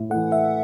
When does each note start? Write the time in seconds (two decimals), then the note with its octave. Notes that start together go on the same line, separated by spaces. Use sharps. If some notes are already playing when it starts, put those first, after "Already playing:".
Already playing: A2
0.10 A3 F#5
0.14 E3
0.32 E5